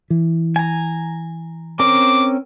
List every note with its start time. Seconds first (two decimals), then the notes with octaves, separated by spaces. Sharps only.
0.10 E3
0.56 G#5 A#5
1.79 C4 C#4 A#4 D6